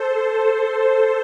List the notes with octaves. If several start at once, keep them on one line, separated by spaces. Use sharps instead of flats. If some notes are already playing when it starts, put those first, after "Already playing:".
Already playing: A4 C5